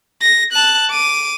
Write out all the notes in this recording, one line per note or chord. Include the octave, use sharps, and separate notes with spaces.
A#6
A5 F#6
D6 D#7